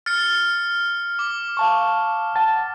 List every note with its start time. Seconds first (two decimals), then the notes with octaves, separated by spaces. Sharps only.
0.06 F6 A6 C#7
1.19 D6
1.57 F5 A5 C#6
2.36 F#5 A5 A6